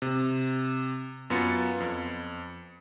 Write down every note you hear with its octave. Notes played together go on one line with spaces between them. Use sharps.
C3
F#2 B3 F4 C#7
F2